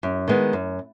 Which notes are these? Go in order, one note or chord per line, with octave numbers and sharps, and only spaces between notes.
F#2
D#3 G#3 B3
F#2